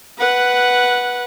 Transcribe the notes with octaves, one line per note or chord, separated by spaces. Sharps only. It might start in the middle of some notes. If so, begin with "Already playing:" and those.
B4 F#5